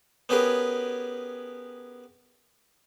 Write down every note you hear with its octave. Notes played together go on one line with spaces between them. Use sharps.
B3 C#4 G4 G#4 A#4 B4